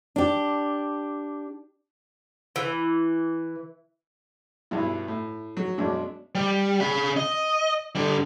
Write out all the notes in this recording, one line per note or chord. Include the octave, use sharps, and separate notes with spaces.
D4 G4
E3
B1 G2 E4
A2
F#3
B1 F#2 G#3 D4
G3
C#3 B5
D#5
D3 G3